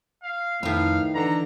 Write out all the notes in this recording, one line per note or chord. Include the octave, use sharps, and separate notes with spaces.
F5
F2 A2 D#3 B4 F5
D3 E3 A#5